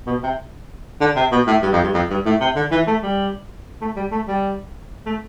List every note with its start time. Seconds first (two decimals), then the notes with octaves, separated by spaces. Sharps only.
0.07 B2
0.23 C3
1.01 D3
1.16 C3
1.32 B2
1.47 A2
1.62 G2
1.72 F2
1.83 G2
1.93 F2
2.10 G2
2.25 A2
2.41 C3
2.56 D3
2.71 E3
2.87 A3
3.03 G3
3.81 A3
3.96 G3
4.11 A3
4.28 G3
5.06 A3